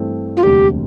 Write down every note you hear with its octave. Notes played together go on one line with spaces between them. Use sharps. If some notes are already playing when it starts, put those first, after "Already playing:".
Already playing: G2 E3 A3 C4
F4
E1 D2 C3 G3 D4 G4